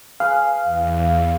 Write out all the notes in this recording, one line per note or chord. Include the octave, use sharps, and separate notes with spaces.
G#4 B4 F5
E2